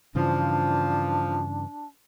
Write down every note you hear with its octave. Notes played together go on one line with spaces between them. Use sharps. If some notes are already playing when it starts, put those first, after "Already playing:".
G2 C#3 E3 F3 D4